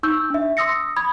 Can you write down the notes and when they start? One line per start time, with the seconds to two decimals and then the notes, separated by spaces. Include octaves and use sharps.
0.03 D#4 C#6 E6 G6
0.30 D4 E5
0.57 C6 D#6 E6 A#6 C#7
0.96 B5 D#6 G#6